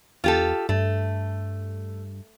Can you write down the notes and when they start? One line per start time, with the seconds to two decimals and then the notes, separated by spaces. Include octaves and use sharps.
0.24 E2 F4 G4 A4
0.69 G2 A3